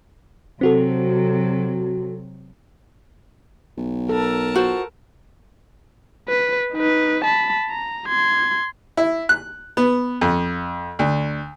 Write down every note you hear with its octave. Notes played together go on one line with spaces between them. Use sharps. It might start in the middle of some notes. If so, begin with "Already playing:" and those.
C3 F#3 C4 F#4 A4
B1
A4 A#4 A5
F4 F#4 C5
B4
D#4 B4
A5 B5
A#5
C6 G#6
E4
F#6
B3
F2
D2